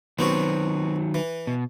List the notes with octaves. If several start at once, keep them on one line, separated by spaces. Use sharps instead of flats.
D#3 F#3 B3 C4 F#4
E3
B2